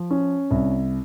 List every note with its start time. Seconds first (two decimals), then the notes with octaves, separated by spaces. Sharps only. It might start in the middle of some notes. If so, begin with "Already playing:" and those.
Already playing: F3
0.11 C#4
0.51 C2